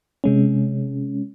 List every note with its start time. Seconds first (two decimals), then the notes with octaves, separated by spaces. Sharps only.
0.24 C3 G#3 C#4